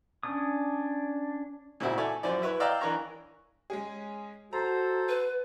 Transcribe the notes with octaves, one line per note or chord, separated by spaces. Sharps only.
C#4 D4 D#6
A#2 C#3 C4 E4 F#4
A4 C#5 D5 E5 G#5
F#2 F3 D5
E4 B4 C#5
D5 D#5 F5 G5 A#5 E6
E3 D4 A#4 C#5 A#5
G#3 C#4 G#4
F#4 A4 C5 A#5
B4